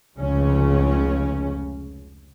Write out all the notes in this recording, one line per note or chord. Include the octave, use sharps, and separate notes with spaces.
F1 C#2 C#3 C#4